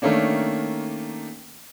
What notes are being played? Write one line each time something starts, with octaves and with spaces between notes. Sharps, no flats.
D#3 A3 A#3 C#4 D4